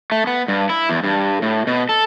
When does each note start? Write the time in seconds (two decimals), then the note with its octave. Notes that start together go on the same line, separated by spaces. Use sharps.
0.12 A3
0.27 B3
0.48 G2
0.69 E4
0.89 E2
1.04 G2
1.42 A2
1.67 B2
1.89 A4